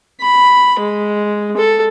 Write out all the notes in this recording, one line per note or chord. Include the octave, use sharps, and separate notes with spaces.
B5
G#3
A4